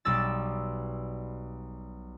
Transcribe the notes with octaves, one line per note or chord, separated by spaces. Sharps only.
B1 B2 G3 D5 E6 A6